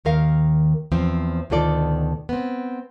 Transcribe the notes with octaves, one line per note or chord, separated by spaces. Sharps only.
D#2 D#3 A#4 F5
E2 F3 C4 F4
D2 B2 D#3 F4 A4 D5
B3 C4